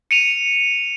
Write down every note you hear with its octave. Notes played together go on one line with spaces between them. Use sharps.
C#7 D#7 F7